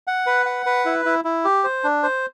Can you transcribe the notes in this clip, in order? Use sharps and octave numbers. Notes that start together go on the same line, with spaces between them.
F#5
B4
F#5
B4
E4
E4
E4
G4
C5
D4
C5